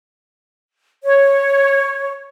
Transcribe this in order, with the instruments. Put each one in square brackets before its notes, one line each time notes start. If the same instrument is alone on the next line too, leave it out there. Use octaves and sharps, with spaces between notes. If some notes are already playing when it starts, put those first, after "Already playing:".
[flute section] C#5